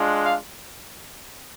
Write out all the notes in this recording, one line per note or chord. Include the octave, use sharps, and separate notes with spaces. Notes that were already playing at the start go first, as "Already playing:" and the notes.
Already playing: G#3 D4 F4
F5